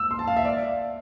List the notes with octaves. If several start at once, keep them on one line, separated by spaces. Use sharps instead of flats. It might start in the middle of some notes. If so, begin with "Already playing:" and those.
Already playing: E6
C6
A5
F5
E5
D5